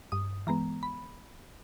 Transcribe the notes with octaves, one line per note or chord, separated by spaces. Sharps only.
G2 D#6
E3 G#3 B3 A#5
B5